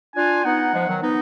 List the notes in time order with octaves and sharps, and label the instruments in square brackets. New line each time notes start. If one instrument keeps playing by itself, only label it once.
[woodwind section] D4 F4 [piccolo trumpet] G#5
[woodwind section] B3 D#4 [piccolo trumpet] F#5
[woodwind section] F3 G#3
D#3 F#3
B3 D#4